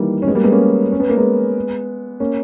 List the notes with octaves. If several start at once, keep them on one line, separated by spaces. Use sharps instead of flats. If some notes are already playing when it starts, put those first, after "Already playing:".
Already playing: D#3 E3 G3 A#3
C#4
G#3 B3
G3 A#3
G#3 B3
A#3 C#4
C#4
B3
A#3
G#3 B3
A#3 C#4